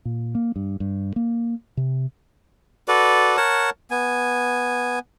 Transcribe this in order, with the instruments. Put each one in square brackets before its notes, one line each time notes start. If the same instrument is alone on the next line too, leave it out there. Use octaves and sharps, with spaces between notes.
[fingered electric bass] A#2
A#3
G2
G2
A#3
C3
[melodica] F#4 A4 B4 D5
A#4 C#5 F#5 A5
B3 G#5